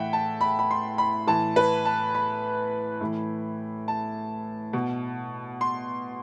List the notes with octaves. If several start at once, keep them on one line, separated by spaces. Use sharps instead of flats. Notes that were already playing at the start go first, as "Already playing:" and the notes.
Already playing: A2 E3 E5 F#5 G5
A5
B5
B5
C6
B5
A2 E3 A5
B4
A5
B5
A2 E3
A5
B2
C6